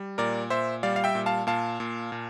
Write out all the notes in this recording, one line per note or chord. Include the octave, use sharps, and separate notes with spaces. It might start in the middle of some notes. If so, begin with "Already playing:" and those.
Already playing: G3
A#2 A#4 D5
A#2 C5 E5
G3 D5 F5
F5
E5 G5
A#2
F5 A5
A#2 F5 A5
A#2
A#2